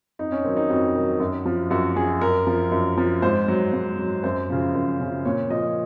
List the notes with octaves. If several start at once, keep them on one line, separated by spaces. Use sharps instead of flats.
F2 D#4
C#4
D#3 F#3 C4
D#4
F2 F#4
D#3 F#3
F#2
F3
F#2 F#4
F3 G#4
F#2 A#4
F3
F#2
F3
G#2 C5
F#3
G#2
F#3
F#2 C5
C#3 F3
F#2
C#3 F3
A#2 C#5
F3 D#5